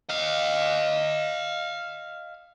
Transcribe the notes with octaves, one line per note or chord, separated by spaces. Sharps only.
D#5 F5